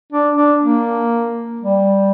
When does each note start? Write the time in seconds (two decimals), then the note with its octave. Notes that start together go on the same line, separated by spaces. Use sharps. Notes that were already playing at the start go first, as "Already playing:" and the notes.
0.12 D4
0.37 D4
0.62 A#3
1.61 G3